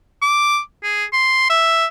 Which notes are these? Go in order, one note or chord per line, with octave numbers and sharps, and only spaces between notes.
D6
G#4
C6
E5